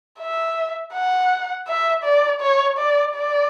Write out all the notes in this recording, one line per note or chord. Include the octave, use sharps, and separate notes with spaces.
E5
F#5
E5
D5
C#5
D5
D5